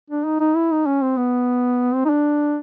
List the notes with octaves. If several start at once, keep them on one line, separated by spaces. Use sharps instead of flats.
D4
D#4
D#4
E4
D#4
C#4
C4
B3
C4
D#4
D4